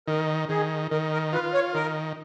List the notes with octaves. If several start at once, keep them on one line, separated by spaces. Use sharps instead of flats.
D#3 A#4
D#3 G#4
D#3 A#4
A#4
F4 B4
C#5
D#3 A#4